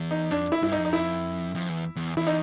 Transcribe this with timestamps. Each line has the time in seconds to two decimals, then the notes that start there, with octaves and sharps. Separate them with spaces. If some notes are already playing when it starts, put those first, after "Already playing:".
Already playing: E2
0.11 D#4
0.31 F2 D4
0.52 E4
0.62 G2 E4
0.72 D#4
0.78 F2
0.85 D#4
0.93 E4
1.55 F2
1.69 E2
1.96 E2
2.17 E2 E4
2.27 D#4